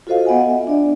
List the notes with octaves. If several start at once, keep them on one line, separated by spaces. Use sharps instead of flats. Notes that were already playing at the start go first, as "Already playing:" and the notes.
F4 F#4 A4 C5 D#5 F5
B3 D#5 F#5 G#5
E5
D4 D5